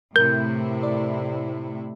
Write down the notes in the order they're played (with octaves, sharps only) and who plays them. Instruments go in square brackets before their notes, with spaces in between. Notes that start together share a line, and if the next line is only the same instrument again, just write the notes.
[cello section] A2 C3 E4 [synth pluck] A#4 [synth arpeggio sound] G6
[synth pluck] D5